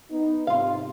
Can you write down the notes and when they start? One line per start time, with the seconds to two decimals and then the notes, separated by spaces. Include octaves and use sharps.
0.11 B3 D#4
0.47 G#2 C3 F4 F5